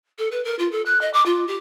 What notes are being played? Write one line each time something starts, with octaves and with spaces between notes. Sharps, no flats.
A4
B4
A#4
F4
A4
F#6
D#5
D6
F4
G4